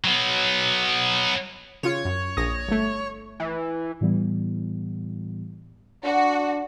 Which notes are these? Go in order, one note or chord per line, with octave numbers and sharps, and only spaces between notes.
F#3 B3
C#3 F4 C#5
F#2
A#1 D#6 A#6
G1 A3
E3
A2 E3 G3 B3
D4 F#4